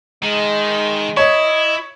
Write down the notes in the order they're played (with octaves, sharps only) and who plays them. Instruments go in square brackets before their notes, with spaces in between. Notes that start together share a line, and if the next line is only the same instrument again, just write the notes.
[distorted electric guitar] D#3 [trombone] G#3
[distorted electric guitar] E4 [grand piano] C#5 [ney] D#5